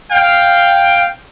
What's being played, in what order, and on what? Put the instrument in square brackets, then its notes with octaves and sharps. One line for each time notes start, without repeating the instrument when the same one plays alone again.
[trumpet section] F5 G5